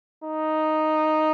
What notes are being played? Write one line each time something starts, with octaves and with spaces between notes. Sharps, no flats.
D#4